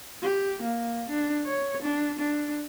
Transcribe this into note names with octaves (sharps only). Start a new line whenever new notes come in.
G4
A#3
D4
C#5
D4
D4